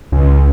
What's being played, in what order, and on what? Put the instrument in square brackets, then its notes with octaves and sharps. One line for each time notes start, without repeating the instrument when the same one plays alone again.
[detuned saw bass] C#2